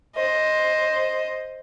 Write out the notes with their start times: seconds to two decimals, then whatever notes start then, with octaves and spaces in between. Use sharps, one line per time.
0.16 C5 D#5